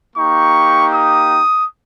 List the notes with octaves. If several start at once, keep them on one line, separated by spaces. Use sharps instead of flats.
A#3 D#4 G4 C#6
D#6